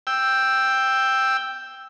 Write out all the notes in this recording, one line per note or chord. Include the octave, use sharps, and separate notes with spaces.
G5 E6